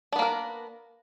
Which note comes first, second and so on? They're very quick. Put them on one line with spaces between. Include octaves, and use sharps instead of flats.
D4 B3 A#3 A#4